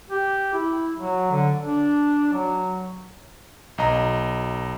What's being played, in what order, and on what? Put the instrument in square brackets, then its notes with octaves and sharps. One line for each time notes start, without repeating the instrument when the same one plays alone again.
[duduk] G4
E4
F#3
D3
D4
F#3
[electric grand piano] B1 D#5 A#5